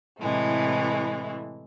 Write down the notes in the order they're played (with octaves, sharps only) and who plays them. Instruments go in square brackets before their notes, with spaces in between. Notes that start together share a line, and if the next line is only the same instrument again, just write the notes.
[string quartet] A2 C3 E3 G#3 A3